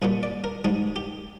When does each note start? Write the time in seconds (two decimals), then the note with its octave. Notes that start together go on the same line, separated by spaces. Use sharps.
0.02 C2 A#2 G3 G#4
0.23 D5
0.44 A#4
0.65 G#2 G3 G#4
0.96 G4